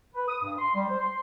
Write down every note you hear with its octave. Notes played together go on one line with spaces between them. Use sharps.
B4
D#6
G2
C6
G3
C5
C6